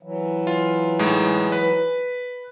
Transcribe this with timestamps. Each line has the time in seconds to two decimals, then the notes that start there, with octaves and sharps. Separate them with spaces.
0.03 E3 F#3
0.47 F4
0.99 A2 G#3 D#4
1.52 B4